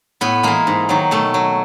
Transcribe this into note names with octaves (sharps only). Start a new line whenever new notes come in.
A2 B3
E3 G#3 A#3
G#2
D#3 F#3
B2 A3
F#3